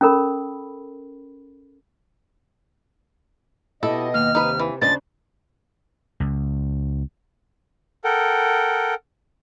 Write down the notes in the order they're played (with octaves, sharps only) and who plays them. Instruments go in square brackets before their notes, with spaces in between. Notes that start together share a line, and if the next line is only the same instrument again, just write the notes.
[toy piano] C#4 A4 A#4 B5
[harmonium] B2 D#5 [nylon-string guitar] E4 G4 [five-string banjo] A4
[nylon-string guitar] D#2 [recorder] F6
[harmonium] C3 [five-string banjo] D#4 B4
[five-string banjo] E3
[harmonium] D#2 [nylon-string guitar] C#3 C#4 D4 [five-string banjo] F3 G#3 C5 [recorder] A6
[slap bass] C#2
[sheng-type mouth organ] A4 A#4 F#5 G5